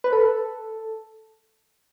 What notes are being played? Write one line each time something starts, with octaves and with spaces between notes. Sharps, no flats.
B4
A4